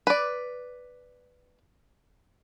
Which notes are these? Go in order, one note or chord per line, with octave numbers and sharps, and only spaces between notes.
B4 D5